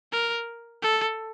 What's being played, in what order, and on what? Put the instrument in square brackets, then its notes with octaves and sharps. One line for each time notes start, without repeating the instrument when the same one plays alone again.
[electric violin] A#4
A4